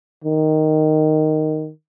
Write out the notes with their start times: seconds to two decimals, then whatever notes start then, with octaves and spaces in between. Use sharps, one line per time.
0.24 D#3